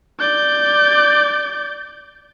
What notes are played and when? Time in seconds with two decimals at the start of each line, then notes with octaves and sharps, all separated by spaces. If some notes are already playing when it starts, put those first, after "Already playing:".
0.20 D5 G6